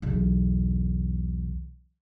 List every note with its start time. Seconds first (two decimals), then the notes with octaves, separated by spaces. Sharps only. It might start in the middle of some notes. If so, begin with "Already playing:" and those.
0.02 B1 E2